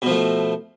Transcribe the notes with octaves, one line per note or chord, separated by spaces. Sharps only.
B2 F3 A3